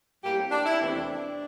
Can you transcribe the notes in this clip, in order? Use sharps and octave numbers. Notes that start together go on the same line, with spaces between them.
A2 G3 A#3 G4
C4
D4
E4
E2 C3 E3 A3 C4 D4